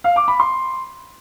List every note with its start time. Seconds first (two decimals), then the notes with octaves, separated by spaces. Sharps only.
0.04 F5
0.16 D6
0.28 B5
0.40 C6